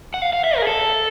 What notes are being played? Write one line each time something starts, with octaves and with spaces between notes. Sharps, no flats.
F#5
F5
F5
E5
A#4
G#4
A4